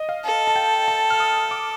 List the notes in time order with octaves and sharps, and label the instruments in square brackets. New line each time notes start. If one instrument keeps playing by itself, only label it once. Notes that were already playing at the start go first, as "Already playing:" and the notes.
Already playing: [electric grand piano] D#5
F5
[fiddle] A4
[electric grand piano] A5
G5
A5
F6
D#6
D6